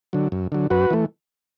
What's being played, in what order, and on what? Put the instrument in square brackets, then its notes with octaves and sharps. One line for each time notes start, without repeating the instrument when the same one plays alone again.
[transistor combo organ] D3 F#3
F#2
D3 F#3
F#2 F#4 B4
E3 A3